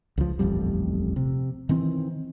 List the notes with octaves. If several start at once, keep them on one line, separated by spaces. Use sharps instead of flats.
C#2 F3
D#1 A1 F2 G3
C3
D#3 E3 C4